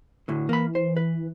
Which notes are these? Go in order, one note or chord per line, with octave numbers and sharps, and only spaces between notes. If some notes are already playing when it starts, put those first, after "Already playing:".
D2 A2 D3
E3 A#3 B5
C5
B4